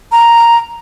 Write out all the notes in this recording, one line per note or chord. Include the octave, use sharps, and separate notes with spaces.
A#5